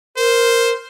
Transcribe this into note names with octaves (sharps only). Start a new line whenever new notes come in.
A#4 C5